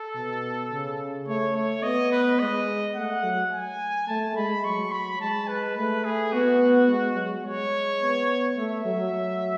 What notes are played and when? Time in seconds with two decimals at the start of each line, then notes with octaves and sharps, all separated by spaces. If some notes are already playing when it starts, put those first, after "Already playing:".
Already playing: A4
0.15 B2
0.72 C#3
1.28 A3 C#5
1.56 C#5
1.83 B3 D#5
2.12 B4
2.39 G#3 D#5
2.96 A3 F#5
3.24 F#3
3.53 G#5
4.08 A3 A5
4.36 G#3 B5
4.64 F#3 C#6
4.92 B5
5.20 G#3 A5
5.48 B4
5.76 A3 B4
6.05 G#4
6.33 B3 F#4
6.89 G#3
7.16 F#3
7.44 G#3 C#5
8.01 B3
8.57 A3 E5
8.86 F#3